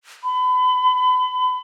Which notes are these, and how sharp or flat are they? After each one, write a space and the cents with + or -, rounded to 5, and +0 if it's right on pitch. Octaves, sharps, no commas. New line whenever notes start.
B5 +35